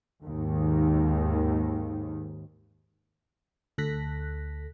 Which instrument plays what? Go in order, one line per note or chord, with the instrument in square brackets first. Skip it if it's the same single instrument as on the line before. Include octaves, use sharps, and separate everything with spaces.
[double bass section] D#2 G#2 D#3
[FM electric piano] D2 A4 F#6 A#6 B6